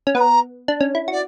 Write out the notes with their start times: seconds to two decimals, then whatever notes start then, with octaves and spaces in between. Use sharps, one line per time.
0.07 C#4
0.15 B3 B5
0.20 A#5
0.68 D4
0.81 C#4
0.95 E4
1.08 F#4 D5